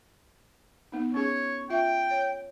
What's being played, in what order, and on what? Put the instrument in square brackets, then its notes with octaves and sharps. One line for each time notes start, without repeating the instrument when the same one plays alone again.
[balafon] B3 D#4
[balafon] C#4 G#4 [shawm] C#5
[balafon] F4 E5 [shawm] G5
[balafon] C#5